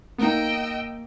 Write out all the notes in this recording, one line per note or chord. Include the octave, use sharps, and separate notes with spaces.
A#3 B3 D#4 D#5 G5 E6